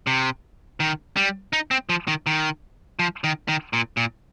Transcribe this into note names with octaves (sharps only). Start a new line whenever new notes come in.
C3
D#3
G3
D#4
C4
F3
D#3
D#3
F3
D#3
D#3
A#2
A#2